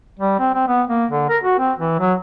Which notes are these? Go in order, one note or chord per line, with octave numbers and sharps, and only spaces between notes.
G3
C4
C4
B3
A#3
D3
A#4
F#4
C4
E3
F#3